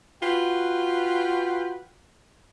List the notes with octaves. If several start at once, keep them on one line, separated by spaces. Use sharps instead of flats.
F4 F#4 B4 G5